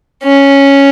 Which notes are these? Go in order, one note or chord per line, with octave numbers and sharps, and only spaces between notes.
C#4